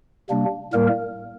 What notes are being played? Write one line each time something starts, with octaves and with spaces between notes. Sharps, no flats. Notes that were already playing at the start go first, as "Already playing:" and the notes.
C3 G3 A#3 D4
A2 G3 A#3 A#4